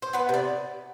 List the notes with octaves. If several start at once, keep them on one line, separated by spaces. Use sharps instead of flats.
C5
B3 B4
C3 D5